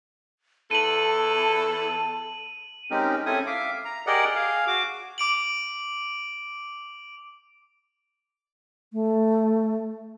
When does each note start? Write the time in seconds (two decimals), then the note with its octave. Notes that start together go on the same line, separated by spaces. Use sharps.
0.71 E2 E4 A4 A5 D#7 F#7
2.91 G#3 C4 C#4 D#4 G4 A#4
3.26 C4 C#4 E4 A4 G#5 D#6
3.47 E5 F5 D6
3.85 A#5
4.07 G4 G#4 A#4 D5 D#5 F#5
4.35 G#4 F5
4.67 F#4 D6
5.18 D6 D7 F#7
8.93 A3